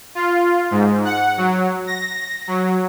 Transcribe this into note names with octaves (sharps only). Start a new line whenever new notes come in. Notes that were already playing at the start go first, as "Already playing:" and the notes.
F4
G#2
F#5
F#3
A#6
F#3